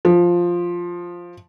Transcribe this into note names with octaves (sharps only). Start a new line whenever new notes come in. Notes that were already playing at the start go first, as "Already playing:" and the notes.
F3